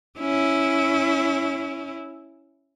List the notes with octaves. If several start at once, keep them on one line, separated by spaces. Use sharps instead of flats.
C#4 E4